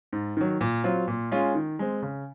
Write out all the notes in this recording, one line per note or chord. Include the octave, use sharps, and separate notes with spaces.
G#2
D#3 F#3
A#2
F#3 C4 F4
A#2
G#3 C#4 F4
D#3
G#3 C4
C#3